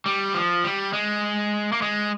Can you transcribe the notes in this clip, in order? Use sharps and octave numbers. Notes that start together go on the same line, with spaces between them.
G3
F3
G3
G#3
A#3
G#3